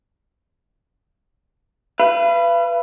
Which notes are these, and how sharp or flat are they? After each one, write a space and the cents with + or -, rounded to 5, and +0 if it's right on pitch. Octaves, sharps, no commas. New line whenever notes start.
B4 +0 F5 -40